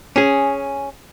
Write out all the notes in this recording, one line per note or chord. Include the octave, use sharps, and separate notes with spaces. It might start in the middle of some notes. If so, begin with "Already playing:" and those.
C#4 G#4